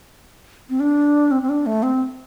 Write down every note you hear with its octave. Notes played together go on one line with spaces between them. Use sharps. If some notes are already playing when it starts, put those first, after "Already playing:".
C4
D4
C4
C4
D4
A3
C4